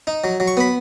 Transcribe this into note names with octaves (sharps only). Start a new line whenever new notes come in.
D#4
F#3
F#3
C#6
B3 B5